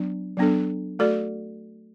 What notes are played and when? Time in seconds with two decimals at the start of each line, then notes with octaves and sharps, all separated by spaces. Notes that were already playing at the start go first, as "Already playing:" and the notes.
Already playing: F#3 B3 D4
0.37 F#3 B3 D4 A4
0.99 A3 F#4 A4 D5